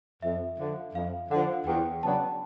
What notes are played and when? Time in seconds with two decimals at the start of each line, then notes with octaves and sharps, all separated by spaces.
0.22 F2 E5
0.59 D3 F3
0.94 F2 F5
1.31 D3 F3 F#5
1.67 E2 G5
2.03 C#3 F#3 B3 D4 A5